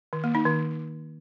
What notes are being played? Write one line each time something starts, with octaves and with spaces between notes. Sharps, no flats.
D#3
A#3
D#4
D#3